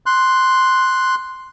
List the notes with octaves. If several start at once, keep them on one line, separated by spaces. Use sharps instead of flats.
C6 F#6